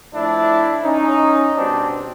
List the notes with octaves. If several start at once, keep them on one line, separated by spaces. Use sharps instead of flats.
A2 F3 D4 E4
C#4 D#4
B2 G3 C4 D4